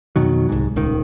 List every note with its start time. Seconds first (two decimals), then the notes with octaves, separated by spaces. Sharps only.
0.16 F2 B2 D#3 F#3
0.49 C2 G#2
0.76 D#1 C#2 D#3